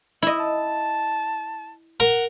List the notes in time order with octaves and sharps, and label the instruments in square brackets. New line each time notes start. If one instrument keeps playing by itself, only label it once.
[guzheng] E4 D#5 [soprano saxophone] E5
[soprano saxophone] A5
[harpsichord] A#4 [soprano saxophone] F#5